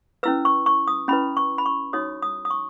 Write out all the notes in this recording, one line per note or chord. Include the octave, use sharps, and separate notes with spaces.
C#4 E4 B4 E6
C#6
C#6
D#6
C#4 E4 B4 B5
C#6
B5
C#6
D#4 F#4 C#5 D#6
D#6
D#6
C#6